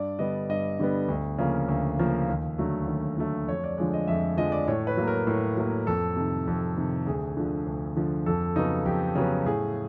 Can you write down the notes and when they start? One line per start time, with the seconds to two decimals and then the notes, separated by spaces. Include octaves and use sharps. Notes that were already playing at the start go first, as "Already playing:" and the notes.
Already playing: G2 D5
0.19 D3 G3 B3 D#5
0.49 G2 D#5
0.80 D3 G3 B3
1.08 D2
1.38 C#3 F3 A#3
1.69 D2
1.99 C#3 F3 A#3
2.29 D#2
2.58 D3 F#3 A3
2.88 D#2
3.18 D3 F#3 A3
3.48 F2 C#5
3.64 D5
3.78 D3 F3 G#3 D5
3.93 D#5
4.07 F2 E5
4.37 D3 F3 G#3 D#5
4.52 D5
4.67 A2 C#5
4.87 B4
4.97 F#3 A#3
5.08 A#4
5.27 A2
5.57 F#3 A#3
5.87 F2 A4
6.16 C3 D#3
6.47 F2
6.76 C3 D#3
7.07 D2 G#4
7.37 D3 F3
7.67 D2
7.96 D3 F3
8.26 F2 A4
8.56 C#3 F#3 B3 D#4
8.86 F2 G4
9.15 C#3 F#3 B3
9.46 A2 G#4